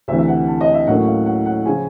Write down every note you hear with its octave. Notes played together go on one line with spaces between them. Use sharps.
D2 C3 E3 E5
E5
F#5
A5
D#5
E5
A2 F#3 A#3 C#4 F#5
F5
F#5
F#5
C#3 F3 G#5